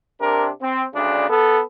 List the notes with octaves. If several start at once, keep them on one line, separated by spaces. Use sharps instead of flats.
C3 D4 A#4
C4
D2 C#3 D4
B3 A4